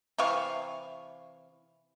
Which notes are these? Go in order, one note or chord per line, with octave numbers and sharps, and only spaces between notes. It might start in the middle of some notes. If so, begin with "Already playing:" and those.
C3 E3 F5 C#6